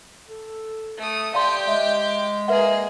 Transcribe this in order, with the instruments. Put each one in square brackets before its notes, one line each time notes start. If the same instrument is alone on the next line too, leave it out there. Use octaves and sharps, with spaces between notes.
[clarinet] A4
[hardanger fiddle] A3 D#6
[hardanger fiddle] G4 G5 [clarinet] D5 [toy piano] F5 A5 C6
[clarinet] G#3 [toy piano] E5
[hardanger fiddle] A#3 G#4 [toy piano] B4 E5 F#5